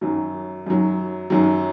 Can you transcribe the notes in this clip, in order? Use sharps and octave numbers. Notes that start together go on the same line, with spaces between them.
F#2 D#3 F#3
F#2 D#3 F#3
F#2 D#3 F#3